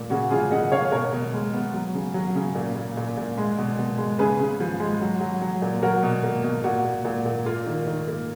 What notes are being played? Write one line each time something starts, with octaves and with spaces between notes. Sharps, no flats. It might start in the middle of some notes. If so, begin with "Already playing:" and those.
Already playing: A#2
C#3 F#4
C#3 F4 G#4
C#3 D#5 F#5
C#3 C#5 F5
B2 A#4 C#5
B2
G#3
B3
F#3
C#3
F#3
C#3
A#2
A#2
A#2
A#2
G#3
B2
B2
G#3
C#3 G#4 B4
C#3
F3
G#3
F#3
F#3
F#3
A#2
F#3 F#4 A#4
B2
A#3
B2
A#2 F#4
A#2
A#2
A#2
A#3 F4
D#3
D#3
A#3